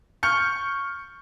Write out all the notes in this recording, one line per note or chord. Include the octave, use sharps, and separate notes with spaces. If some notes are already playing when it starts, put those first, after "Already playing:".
C#6 F6 G6 C#7